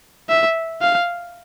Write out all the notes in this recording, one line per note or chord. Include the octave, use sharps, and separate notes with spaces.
E5
F5